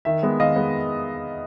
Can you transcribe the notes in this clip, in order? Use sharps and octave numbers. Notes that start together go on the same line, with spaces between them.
D#3 E5
G#3 B3
D#3 D#5 F5
G#3 B3